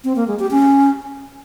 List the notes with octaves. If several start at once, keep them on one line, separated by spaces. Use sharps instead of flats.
C4
A#3
G#3
G4
C#4